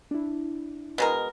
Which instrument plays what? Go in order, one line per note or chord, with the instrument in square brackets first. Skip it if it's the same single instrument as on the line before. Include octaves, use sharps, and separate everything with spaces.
[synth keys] D4 E4
[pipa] B2 G#3 A#4